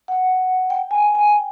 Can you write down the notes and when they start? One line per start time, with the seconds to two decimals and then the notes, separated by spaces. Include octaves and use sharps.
0.08 F#5
0.70 G5
0.91 G#5
1.01 G5
1.15 G#5
1.30 G5